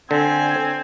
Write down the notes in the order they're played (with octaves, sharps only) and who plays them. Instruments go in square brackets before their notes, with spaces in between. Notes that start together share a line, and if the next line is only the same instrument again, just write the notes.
[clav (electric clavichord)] D3 [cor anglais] C4 [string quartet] G#5